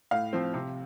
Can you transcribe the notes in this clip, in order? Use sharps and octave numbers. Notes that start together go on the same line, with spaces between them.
A2 F5
F3 C4
C3